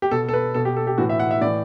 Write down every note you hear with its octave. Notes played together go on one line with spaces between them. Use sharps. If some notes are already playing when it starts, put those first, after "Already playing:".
G4
B2 A4
A4
B4
B2 A4
G4
A4
G4
A2 E3 F#4
E5
F#5
E5
A2 E3 D5